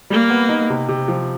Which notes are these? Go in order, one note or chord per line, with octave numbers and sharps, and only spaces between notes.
G3 A#3
B3
D#4
C3
C3
F3